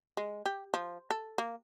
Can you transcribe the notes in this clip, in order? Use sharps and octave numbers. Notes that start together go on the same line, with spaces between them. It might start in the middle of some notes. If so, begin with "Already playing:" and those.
G#3
G4
F3
A4
A#3